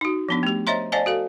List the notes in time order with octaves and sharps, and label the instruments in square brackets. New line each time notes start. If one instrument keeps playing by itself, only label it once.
[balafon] D#4 F#4
F3 B3 D4
A3 G4
C5 C#5 D#5 E5 A#5 C6
C5 D5 D#5 F5 G#5 A5
F#4 A4 F5